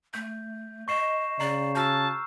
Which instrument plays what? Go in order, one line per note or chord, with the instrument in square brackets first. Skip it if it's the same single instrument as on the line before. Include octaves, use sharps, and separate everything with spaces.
[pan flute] A3 [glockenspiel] G6
[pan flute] D#5 [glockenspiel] C#6 C7 E7
[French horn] C#3 [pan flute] D5 [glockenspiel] A#5 C7
[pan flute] F#4 [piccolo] A5 [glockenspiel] E6 F6 G6